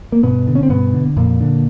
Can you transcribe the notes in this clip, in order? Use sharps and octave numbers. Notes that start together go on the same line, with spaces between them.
A#3
G2 B2 B3
D3
C#4
C4
G2 B2 B3
D3
F2 A#2 A#3
D3